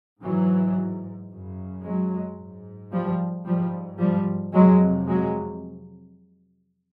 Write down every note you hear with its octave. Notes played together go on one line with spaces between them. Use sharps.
G#2 E3 F#3
F#2 C#3
F#3 G#3
G#2
F3 G3
G#2 F3 G3
F3 G3
F2 C3 F#3 G#3
F#3 G#3